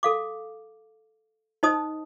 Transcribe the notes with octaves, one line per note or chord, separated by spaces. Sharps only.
A4 F5 D6
D#4 C5 D#5 A5 D#6